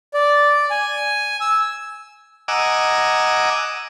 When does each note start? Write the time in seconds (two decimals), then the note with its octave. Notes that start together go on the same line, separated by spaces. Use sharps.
0.14 D5
0.71 G#5
1.41 E6
2.48 D#5 F#5 G#5 A#5 D6 E6